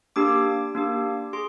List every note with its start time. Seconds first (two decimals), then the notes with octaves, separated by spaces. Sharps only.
0.16 A#3 D4 G4 D6
0.75 A#3 D4 G4
1.33 G#4 C6